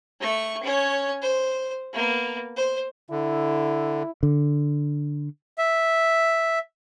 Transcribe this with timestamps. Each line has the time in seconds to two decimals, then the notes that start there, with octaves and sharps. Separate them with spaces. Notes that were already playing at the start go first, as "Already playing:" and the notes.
0.20 A3 C#6
0.63 C#4 C#5
1.22 C5
1.93 A#3 B3
2.57 C5
3.10 D3 E4
4.23 D3
5.58 E5